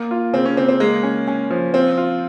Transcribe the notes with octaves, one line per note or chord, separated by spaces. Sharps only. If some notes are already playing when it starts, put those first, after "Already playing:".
Already playing: A#3
F4
C#3 C4
C#4
C#3 C4
C4
G#3 A#3
C#4
C#4
F3
C4 F4
F4